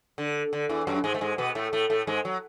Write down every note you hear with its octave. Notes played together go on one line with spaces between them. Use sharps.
D3
D3
E2 E3
F#2 F#3
G#2 G#3
A3
G#2 G#3
B2 B3
A2 A3
A2 A3
A2 A3
G#2 G#3
F#3